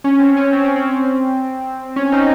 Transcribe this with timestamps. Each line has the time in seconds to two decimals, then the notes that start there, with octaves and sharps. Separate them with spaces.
0.04 C#4
0.19 C4
0.37 C#4
0.53 C4
0.65 C#4
0.76 C4
0.88 C4
1.96 C#4
2.12 C4 D#4